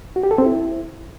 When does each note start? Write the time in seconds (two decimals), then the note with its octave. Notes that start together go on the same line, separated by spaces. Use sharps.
0.16 F#4
0.23 G4
0.31 A4
0.38 C4
0.46 E4